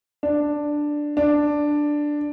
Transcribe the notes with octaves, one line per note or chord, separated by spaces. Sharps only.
D4
D4